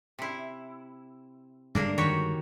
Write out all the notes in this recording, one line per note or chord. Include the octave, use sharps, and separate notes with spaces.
C3 E4
G2 D3 G#3 A#3 D4 A#4
D#3 F#4 G4 C#5